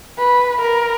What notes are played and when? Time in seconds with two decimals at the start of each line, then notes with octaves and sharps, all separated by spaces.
0.18 B4
0.62 A#4